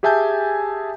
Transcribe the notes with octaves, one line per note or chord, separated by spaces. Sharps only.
G4 G#4 E5 G#5 A5 G6